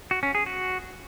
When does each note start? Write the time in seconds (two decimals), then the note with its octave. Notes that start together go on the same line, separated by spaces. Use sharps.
0.11 F#4
0.23 C#4
0.35 G#4
0.46 F#4